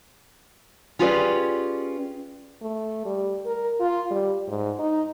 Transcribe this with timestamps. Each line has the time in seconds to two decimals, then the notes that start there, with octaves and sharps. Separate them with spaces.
0.99 C#4 F4 G4 G#4 B4 D5
2.62 A3
3.05 G3
3.46 A#4
3.80 F4
4.11 G3
4.48 G#2
4.79 D#4